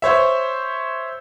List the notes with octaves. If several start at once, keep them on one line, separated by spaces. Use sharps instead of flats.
C5 C#5 E5